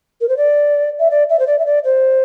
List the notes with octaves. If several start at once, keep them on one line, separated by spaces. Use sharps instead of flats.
A#4
C5
D5
E5
D5
E5
C5
D5
E5
D5
C5